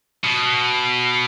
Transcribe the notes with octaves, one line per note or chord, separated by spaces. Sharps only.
B2